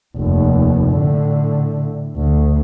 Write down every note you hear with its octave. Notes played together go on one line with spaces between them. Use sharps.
F1 D#2
A2 D3
D2